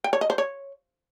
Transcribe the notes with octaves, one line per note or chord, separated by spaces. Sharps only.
G5
C#5
D#5
C5
C#5